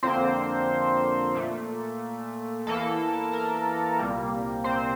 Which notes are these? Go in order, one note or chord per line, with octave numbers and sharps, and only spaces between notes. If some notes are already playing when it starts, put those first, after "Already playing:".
F2 D3 F3 A#3 C4 C5
A#2 A3
E2 E3 A#3 A4
A#4
C2 A#2 G3 A#3
C4 C5